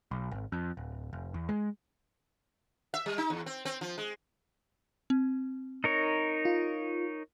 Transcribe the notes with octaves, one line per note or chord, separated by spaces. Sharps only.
B1
G#1
F2
D1
F1
E2
G#3
E5
G3
D#4
E2
C4
C4
F3
G#3
C4
D#4 A#4 C#5
F4